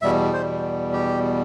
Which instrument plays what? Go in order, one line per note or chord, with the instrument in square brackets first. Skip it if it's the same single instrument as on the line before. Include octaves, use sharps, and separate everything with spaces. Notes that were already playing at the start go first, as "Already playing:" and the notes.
[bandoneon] E2 B2 G3 E5
C5
G4